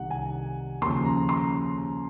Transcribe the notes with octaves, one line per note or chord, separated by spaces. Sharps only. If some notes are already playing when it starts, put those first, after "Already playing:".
Already playing: C2 C3 D#3 F#5
G#5
D#2 C#3 F3 C6
A#5
C6